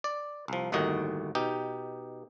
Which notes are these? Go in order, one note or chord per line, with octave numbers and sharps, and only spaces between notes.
D5
C2 F3
G1 D#2 A2 D#3 F#4 D#5
B2 D#4 G4